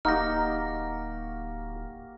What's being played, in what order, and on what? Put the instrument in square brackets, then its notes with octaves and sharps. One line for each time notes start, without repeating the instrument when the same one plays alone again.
[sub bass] D1 [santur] A#3 F#4 G4 [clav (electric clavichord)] D#4 [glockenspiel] F6 A#6